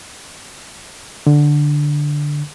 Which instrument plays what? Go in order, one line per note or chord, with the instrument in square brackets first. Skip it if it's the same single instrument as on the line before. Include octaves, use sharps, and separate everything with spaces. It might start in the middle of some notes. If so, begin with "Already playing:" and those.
[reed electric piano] D3